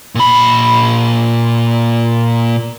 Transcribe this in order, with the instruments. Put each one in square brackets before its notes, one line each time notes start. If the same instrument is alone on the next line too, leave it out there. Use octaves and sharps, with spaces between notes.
[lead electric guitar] A#2 B5